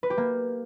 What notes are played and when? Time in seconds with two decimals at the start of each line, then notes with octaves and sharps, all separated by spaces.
0.03 B4
0.10 G4
0.18 A#3